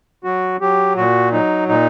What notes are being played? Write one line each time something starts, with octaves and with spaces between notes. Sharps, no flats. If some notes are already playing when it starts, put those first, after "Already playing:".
F#3 F#4
F#3 G4
A#2 F#4
F#3 D#4
A#2 D#4